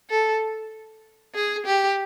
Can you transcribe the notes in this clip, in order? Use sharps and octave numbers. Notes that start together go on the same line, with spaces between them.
A4
G#4
G4